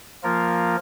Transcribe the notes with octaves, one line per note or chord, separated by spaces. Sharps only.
F3 A#3 F4 A#4